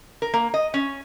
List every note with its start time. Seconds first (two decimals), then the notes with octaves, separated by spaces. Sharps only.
0.22 A#4
0.34 A#3
0.54 D#5
0.74 C#4